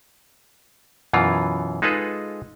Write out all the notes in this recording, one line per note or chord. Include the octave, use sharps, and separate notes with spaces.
F#2 B2 E3 F4
G#3 D#4 F4 G#4 A4 B4